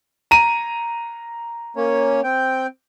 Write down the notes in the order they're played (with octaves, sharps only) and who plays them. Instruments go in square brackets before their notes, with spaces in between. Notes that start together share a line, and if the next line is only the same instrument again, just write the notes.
[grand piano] A#5 D#7
[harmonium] A#3 C#4 C#5
C4 G5